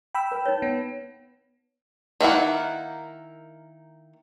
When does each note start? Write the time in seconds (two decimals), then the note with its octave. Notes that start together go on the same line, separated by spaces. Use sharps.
0.15 G5 B5 E6
0.32 B4
0.45 D#4 B4 C#5
0.62 B3
2.21 D#3 A#3 E4 F#5